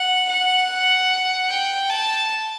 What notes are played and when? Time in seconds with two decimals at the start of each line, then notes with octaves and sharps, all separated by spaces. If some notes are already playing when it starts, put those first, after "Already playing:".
Already playing: F#5
0.29 F#5
1.49 G5
1.90 A5